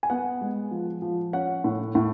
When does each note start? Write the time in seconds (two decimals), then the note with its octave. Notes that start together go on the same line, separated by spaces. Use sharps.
0.03 G#5
0.10 B3 F#5
0.41 G#3
0.71 F3
1.02 F3
1.33 C#4 F#5
1.64 A2
1.95 A2